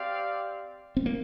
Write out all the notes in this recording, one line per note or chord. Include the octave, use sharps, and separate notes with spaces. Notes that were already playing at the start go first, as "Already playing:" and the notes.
Already playing: C4 G4 D5 F5
C4
A#3